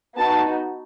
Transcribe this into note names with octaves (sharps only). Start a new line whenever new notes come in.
B3 D#4 F#4 A5